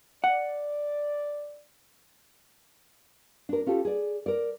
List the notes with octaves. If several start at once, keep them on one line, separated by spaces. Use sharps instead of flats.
D5 F#5
D4 A#4
C#4 F4 G4 A4
G#4 D5
A#4 D5